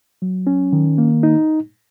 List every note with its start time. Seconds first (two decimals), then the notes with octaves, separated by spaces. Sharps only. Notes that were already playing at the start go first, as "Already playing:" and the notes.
0.22 F#3
0.47 C#4
0.73 D#3
0.98 A#3
1.23 D#4